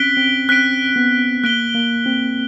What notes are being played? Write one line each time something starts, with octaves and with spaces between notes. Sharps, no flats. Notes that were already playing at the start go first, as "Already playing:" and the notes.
Already playing: C4 C#4 F#6 B6 D7 G7
C4
C4 F#6 B6 D7 G7
B3
A#3 F#6 B6 D7 G7
A#3
C4